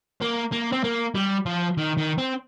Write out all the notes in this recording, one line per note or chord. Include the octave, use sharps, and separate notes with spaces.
A#3
A#3
C4
A#3
G3
F3
D#3
D#3
C4